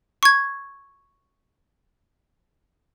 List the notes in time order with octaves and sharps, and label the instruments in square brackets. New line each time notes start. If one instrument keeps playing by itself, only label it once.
[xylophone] C#6 G#6